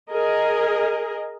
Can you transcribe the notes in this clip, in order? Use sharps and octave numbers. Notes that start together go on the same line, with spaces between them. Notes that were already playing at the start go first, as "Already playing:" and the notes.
G#4 A#4 D#5